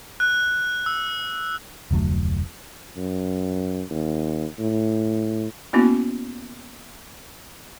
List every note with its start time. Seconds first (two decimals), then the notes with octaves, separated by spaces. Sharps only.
0.20 F#6
0.86 E6
1.91 F1 D2 F#3 A3
2.97 F#2
3.90 D#2
4.59 A2
5.73 A#3 B3 C#4 E4 F#4